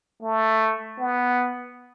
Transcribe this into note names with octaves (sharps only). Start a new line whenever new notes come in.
A3
B3